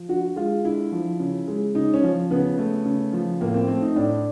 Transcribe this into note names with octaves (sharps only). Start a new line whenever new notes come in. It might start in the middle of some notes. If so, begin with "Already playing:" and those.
Already playing: F3
D3 F#4
G#3 F4
D3 E4
F3
C#3
G#3
C#3 D#4
C#4
F3
C#3 B3
A3
C#3
F3
A2 A#3
C4
A3 C4
D#4
A2 D4